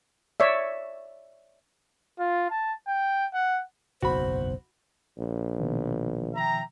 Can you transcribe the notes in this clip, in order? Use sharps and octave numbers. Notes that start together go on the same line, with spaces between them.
C#5 D5 E5
F4
A5
G5
F#5
F#1 B1 E2 F#4 C5 B5
A#1
B2 D#3 F3
E5 G5 A#5